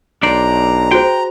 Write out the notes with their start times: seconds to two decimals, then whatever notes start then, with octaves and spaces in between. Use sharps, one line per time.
0.23 B1 D4 C5 D5 A#5
0.91 F#4 G#4 C5 G5